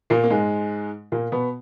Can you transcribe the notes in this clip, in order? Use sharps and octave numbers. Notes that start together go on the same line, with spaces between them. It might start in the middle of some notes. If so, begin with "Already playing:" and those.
A#2 A#3
A#3
G#2 G#3
A#2 A#3
B2 B3